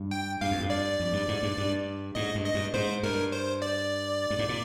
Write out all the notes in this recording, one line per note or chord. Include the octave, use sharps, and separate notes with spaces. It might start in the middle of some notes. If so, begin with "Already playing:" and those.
Already playing: G2
G5
G2 F5
F2
G2
D5
F2
G2
G#2
G2
G2
G#2 D#5
G2
D#5
G2
G#2 C5
G2 A#4
C5
D5
G2
G#2
A#2